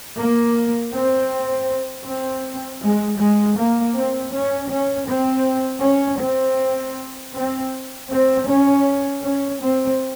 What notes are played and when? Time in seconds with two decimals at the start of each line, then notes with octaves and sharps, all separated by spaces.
0.17 A#3
0.93 C4
2.05 C4
2.82 G#3
3.19 G#3
3.56 A#3
3.95 C4
4.33 C#4
4.71 C#4
5.07 C4
5.83 C#4
6.21 C4
7.35 C4
8.09 C4
8.47 C#4
9.23 C#4
9.61 C4